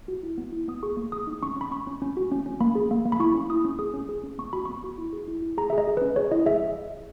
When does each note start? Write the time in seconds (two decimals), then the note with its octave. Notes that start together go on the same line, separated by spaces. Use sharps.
0.08 F#4
0.23 E4
0.38 B3
0.52 E4
0.68 B3 D#6
0.83 G#4 C#6
0.97 A#3
1.12 G#4 D#6
1.27 D#4
1.43 C#4 C#6
1.56 C#4 B5
1.71 C#4 C#6
1.87 C#4
2.02 C#4
2.17 F#4
2.32 C#4
2.46 C#4
2.60 A#3 B5
2.75 G#4
2.91 A#3
3.06 A#3
3.12 B5
3.20 E4 C#6
3.34 C#4
3.50 E4 D#6
3.65 C#4
3.79 G#4 D#6
3.94 C#4
4.09 G#4
4.23 C#4
4.38 B3 C#6
4.53 F#4 B5
4.65 B3 C#6
4.84 F#4
4.98 E4
5.13 G#4
5.28 E4
5.42 E4
5.58 G#4 A#5
5.70 G#4 E5
5.78 D#5
5.88 G#4
5.97 C#4 B4
6.16 G#4 C#5
6.31 E4 D#5
6.46 G#4 E5